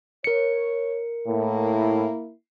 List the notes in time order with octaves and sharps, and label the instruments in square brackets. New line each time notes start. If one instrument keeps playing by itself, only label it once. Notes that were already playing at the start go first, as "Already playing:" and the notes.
[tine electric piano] A#4 C#7 [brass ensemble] C#5
[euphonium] A2 [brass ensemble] A#3 E4